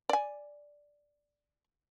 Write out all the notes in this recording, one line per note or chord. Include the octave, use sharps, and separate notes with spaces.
D5 G#5